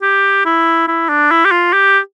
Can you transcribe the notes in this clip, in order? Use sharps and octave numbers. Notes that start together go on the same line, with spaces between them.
G4
E4
E4
D4
E4
G4
F4
G4